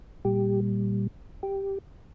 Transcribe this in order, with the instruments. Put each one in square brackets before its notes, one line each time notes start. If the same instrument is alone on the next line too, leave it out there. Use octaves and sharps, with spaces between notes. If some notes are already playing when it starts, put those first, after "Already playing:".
[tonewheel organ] A#2 G3 G4
G4